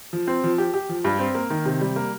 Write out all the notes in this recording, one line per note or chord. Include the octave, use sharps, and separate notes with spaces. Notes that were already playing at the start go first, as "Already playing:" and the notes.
F3
C4
F3
G4
G4
F3
G2
C4
A#3
D#3
C3
G3
A#3